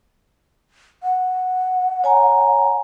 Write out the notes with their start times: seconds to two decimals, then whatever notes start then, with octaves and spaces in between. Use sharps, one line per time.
1.03 F#5
2.04 C#5 G#5 A#5